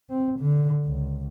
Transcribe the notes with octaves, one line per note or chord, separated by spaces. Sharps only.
C4
D3
C#2